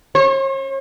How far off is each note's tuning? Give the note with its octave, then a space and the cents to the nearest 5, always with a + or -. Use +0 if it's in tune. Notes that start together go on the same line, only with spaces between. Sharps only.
C#5 -45